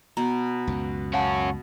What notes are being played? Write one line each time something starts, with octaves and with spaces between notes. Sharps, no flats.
B2 A#5
C#2 F#2
C#4 F#4 F5 F#5 A5